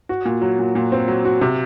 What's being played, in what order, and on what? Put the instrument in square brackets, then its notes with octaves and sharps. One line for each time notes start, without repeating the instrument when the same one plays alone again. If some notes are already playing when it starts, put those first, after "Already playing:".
[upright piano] F#4
A#2
F#3
A#2
A#2
C4
F#3
F#4
C3